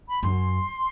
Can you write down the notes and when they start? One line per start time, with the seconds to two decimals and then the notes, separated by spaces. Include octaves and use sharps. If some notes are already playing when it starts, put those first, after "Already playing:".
0.08 B5
0.22 F#2 C6